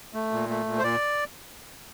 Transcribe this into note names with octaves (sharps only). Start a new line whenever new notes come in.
A3
A#2
A3
A#2
C5
A#2 D5